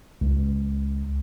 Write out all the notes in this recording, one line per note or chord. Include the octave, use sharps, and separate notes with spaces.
C#2